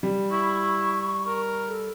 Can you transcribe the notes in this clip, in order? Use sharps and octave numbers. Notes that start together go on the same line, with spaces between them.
G3
E4 C#6
A#4
A4